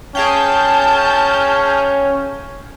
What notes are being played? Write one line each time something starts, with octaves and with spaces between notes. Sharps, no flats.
C#4 G#4 F5 G5 A5 G6